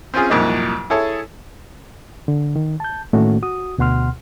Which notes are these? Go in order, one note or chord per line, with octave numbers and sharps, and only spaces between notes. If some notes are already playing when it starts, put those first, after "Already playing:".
C4 C#4 F4 G#4
C2 F2 A#2 F#3 A#3 D#4
E4 G#4 A4 C#5 A5
D3
D#3
A5 G6
A2 D#3 A3 A#3 C#4 F#4
F#4 D#6
D2 B2 F#5 C6 F6